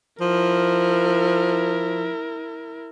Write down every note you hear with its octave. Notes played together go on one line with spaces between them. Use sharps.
F3 E4 A#4